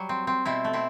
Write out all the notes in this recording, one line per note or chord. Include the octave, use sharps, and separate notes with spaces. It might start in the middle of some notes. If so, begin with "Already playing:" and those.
Already playing: F#3 G3
C4
C4
B2 C4 E4
A3
C4 E4